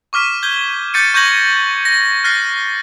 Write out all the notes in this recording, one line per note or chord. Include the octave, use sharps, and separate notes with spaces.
C#6 D6 F6 B6 D#7
G6 G#6 G7
D6 G6 A6 B6 C#7 D#7
C#6 G6 G#6 A#6 F#7 G7
A#6
F6 F#6 A6 A#6 C7